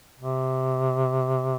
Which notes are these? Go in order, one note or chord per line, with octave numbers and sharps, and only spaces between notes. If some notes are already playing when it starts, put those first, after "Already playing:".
C3